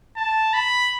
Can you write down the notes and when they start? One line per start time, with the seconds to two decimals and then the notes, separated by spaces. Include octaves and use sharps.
0.16 A5
0.54 B5